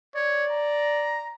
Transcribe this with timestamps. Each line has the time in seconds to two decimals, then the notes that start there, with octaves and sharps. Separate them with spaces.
0.15 C#5 D5
0.51 A#5